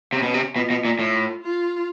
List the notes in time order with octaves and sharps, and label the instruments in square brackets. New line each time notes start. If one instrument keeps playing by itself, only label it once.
[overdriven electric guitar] C3 [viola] C#4
[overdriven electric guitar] B2
C3
[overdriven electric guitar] B2 [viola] F4
[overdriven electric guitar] B2
A#2
A2
[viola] F4